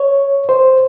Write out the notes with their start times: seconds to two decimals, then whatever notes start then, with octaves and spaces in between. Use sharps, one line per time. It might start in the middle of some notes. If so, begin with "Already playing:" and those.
Already playing: C#5
0.49 C5